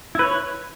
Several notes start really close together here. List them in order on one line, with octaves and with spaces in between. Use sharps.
E4 B4 C#5